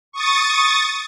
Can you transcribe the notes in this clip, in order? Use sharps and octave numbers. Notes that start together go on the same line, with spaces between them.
C#6 D#6 A6